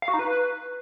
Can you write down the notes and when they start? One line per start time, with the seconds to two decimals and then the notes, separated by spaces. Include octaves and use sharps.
0.02 F5
0.08 F#4
0.14 D#4
0.19 B4